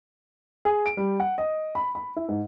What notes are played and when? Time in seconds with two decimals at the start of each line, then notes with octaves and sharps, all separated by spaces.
0.65 G#4
0.86 D7
0.97 G3
1.20 F#5
1.38 D#5
1.75 B5
1.95 B5
2.16 E4
2.29 G#2